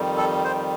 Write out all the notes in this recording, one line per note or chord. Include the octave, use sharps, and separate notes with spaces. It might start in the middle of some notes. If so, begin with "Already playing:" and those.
Already playing: F2 D#3 G3
A4
C5